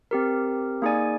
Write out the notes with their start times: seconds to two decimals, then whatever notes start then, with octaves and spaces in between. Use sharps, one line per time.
0.11 C4 G4 A#4
0.82 A#3 D#4 G#4 D5 G#5